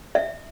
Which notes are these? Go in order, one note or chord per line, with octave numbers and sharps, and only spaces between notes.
E5